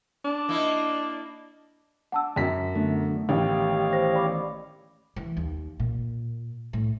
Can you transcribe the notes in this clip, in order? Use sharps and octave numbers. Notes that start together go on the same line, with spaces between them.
D4
A#3 D#4 E4
D4 F#5 A5 E6
F#2 B6
D3 A3 B3
A1 D#3 E3 G4 C#5 F5
C5 A#6
D5 B5 D6
E3
D#2
A#2
A2